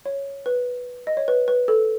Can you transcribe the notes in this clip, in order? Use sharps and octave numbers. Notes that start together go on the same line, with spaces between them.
C#5
B4
D#5
C#5
B4
B4
A4